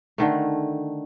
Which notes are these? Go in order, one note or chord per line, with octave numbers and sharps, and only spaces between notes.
D3 D#3 A3